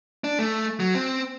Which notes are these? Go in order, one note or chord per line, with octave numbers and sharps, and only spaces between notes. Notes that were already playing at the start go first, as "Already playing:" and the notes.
D4
A3
F#3
C4